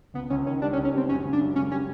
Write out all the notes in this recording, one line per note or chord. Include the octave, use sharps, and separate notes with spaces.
C#2 B3
C#2 C#4
D#3 C#4
G3 D4
C#4
C#2
C#4
G3 C4
F#2 C#4
C#3
D4
F#2
C#3 C#4
G3 C#4